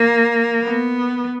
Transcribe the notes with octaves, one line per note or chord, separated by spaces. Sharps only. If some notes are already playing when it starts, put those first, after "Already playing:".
Already playing: A#3
B3